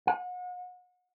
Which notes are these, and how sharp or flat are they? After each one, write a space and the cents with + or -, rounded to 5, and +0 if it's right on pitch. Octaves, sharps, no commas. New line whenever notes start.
F#5 -35